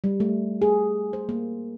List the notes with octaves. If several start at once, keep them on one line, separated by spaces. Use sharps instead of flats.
G3
A3
G#4
C5
A#3